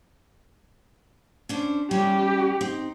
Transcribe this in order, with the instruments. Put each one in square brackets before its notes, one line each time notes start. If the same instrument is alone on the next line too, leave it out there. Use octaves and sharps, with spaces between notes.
[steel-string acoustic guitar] C#4 D4 C5
[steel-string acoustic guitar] G3 C#4 [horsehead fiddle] G4
[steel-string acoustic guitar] C4 D#4